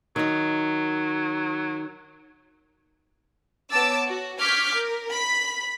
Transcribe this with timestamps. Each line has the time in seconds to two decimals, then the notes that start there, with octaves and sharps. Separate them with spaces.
0.16 D#3 F#3 D#4
3.71 B3 C#5 A5 D6 E6 A6
4.08 F#4
4.39 C#6 D6 F6 G6 G#6 B6
4.74 A#4
5.10 B5 B6